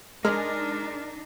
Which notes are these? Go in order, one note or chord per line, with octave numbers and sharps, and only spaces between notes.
G#3 D4 D#4 A#4 F6